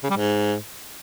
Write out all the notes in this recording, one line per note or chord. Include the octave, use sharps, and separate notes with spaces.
C#3
G3
G#2